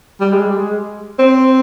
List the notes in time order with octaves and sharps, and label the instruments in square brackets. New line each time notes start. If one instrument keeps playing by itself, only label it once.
[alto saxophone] G3
G#3
G3
G#3
C4